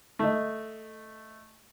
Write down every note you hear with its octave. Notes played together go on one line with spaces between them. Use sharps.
A3 D#5